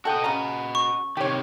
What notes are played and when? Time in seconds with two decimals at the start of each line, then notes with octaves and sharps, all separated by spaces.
0.05 F#4 A4 D#5 G5
0.24 C#3 A#5
0.75 C#6
1.17 C3 D#3 G4 C#5